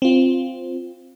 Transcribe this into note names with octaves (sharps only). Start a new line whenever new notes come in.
C4 F4